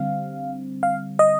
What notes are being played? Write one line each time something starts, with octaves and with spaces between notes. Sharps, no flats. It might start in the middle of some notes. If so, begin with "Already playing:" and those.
Already playing: D3 G3 C4 F5
F5
D#5